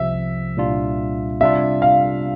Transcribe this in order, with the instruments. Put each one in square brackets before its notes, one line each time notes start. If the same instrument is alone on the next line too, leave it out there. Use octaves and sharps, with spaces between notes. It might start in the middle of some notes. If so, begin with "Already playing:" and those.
Already playing: [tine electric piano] C2 C3 F3 [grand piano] E5
[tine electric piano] C2 A#2 G3 D4 F4
[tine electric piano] C3 G3 D4 F4 [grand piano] E5
[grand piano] F5